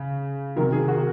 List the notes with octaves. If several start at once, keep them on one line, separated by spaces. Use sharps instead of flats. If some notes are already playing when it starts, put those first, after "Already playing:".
Already playing: C#3
C3 D#3 F#3 A#4
G#4
F#4